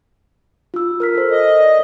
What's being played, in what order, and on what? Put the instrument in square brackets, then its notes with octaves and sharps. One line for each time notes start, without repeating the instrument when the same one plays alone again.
[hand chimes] F4 E6
A#4 F6 B6
A4 A#4 C5
[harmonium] D#5
[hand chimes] D5